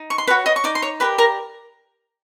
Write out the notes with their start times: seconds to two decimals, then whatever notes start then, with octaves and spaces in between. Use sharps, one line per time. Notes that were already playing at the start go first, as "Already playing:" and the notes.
Already playing: D#4
0.10 C#6
0.18 C6
0.27 F#4 A#4 B4 C#5 B5
0.46 D#5 D#6
0.56 C#6
0.64 D#4 D5 D6
0.75 C6
0.82 C#5 C#6
1.00 G4 A#4 B4 D5 B5
1.18 A#4 A#5